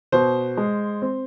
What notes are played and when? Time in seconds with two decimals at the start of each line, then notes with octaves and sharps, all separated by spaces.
0.12 B2 C5
0.57 G#3
1.02 C4